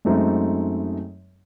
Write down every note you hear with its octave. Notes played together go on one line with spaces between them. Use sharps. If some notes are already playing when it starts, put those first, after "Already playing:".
F#2 F#3 G#3 A3 C4 D#4